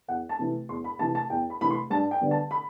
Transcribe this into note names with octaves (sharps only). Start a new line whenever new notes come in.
E2 F#5
A5
C3 E3 A3
E2 C6
B5
C3 E3 A3 A5
A5
E2 G5
B5
C3 E3 A3 B5
C6
G2 A5
G5
D3 G3 B3
A5
B5